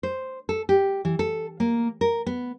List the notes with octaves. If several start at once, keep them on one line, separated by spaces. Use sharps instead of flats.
C5
A4
G4
E3
A4
A#3
A#4
B3